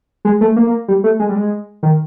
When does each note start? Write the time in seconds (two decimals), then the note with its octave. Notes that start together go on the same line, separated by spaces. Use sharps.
0.25 G#3
0.41 A3
0.56 A#3
0.67 A#3
0.88 G3
1.04 A3
1.19 G#3
1.29 G3
1.35 G#3
1.83 D#3